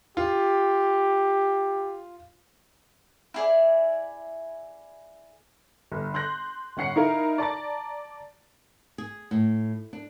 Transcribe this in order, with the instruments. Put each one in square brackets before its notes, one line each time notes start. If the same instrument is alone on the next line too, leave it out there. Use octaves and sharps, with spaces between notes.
[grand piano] F4 [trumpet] G4
[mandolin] E4 G#4 D5
[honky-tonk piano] G1
C6 F#6 G6 A#6
G1 C#4 F#5 C7 C#7
D#4 E4 A#4 F5
D5 A5 A#5 A6
[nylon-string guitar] G#4
A2
D4